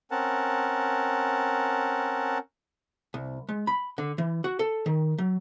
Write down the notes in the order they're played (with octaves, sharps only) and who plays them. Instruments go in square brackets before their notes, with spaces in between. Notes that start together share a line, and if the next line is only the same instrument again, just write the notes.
[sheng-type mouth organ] C4 C#4 A#4 F#5 A5
[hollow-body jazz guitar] C2
G#3
B5
D3
E3
F#4
A4
D#3
F#3